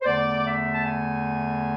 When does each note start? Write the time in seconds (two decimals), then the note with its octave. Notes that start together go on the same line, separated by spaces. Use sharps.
0.01 C5
0.05 E2 D3 A3 D5
0.45 E5
0.73 A5
0.83 G#5